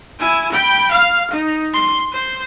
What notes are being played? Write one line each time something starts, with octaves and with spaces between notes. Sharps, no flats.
E4 G#5
G5 B5
F5
D#4
C6
C5